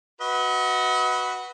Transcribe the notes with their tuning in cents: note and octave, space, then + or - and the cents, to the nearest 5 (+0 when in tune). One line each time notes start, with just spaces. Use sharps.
F#4 +0 B4 +0 D#5 +45